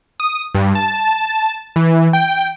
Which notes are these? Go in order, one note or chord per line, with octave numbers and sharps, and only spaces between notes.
D#6
G2
A5
E3
G5